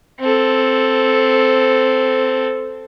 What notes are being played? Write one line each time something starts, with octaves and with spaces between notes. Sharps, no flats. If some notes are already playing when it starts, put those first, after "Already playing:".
C4 A4